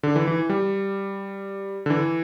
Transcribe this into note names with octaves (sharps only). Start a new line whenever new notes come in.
D3
E3
E3
G3
D3
E3